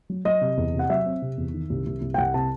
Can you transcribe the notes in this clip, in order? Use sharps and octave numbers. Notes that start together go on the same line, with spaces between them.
F#3
F#3 D#5
C3
E2
C3
F#5
F#3 E5
C4
C3
E2
D#3
C2
C2
C2
G5
C2 F#5
C3 A5